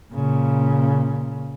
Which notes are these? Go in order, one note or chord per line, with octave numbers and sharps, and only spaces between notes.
A#2 C#3